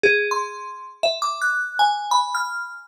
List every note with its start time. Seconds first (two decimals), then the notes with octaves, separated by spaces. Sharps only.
0.03 G#4
0.31 C6
1.03 E5
1.22 D6
1.42 F#6
1.79 G#5
2.11 B5
2.35 F6